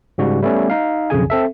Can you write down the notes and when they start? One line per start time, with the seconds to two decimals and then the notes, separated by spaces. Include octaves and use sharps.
0.18 G#2 C#3 G3 F#4
0.42 G3 A3 B3 C#4
0.70 D#4 F5
1.10 B1 F2 C#3 G#4 G#5
1.30 C4 A4 E5